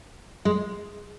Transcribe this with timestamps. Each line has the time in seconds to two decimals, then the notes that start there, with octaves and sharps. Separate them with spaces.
0.45 G#3